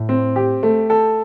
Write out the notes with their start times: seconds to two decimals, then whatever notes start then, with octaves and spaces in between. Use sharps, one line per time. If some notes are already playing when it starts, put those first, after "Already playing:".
Already playing: A2
0.09 C4
0.36 G4
0.63 A3
0.90 A4